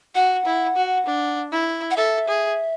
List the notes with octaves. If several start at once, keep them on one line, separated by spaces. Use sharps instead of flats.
F#4 F#5
E4
F#4
D4
E4
F#5
A4 E5
G#4